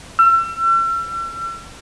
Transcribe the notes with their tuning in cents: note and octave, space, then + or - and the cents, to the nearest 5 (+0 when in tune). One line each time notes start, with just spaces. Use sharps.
E6 +40